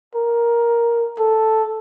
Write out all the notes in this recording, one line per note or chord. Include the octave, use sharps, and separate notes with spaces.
A#4
A4